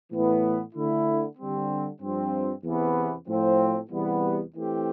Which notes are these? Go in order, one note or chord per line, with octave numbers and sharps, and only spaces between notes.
A2 E3 B3
D3 A3 E4
D3 G3 C4
G2 F3 C4
E2 C3 E3 B3
A2 F3 C4
E2 C3 E3 G3 B3
E3 A3 C4 G4